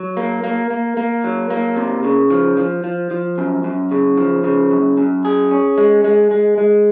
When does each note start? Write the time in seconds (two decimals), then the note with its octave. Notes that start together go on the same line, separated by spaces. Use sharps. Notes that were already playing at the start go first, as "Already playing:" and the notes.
Already playing: F#3
0.17 A#3
0.44 A#3
0.70 A#3
0.97 A#3
1.24 F#3
1.50 A#3
1.77 C3
2.04 C#3
2.30 F3
2.57 F3
2.84 F3
3.11 F3
3.38 F#2
3.64 F#2
3.91 C#3
4.18 F3
4.44 C#3
4.71 F#2
4.97 F#2
5.25 G#4
5.51 C#4
5.78 G#3
6.04 G#3
6.31 G#3
6.58 G#3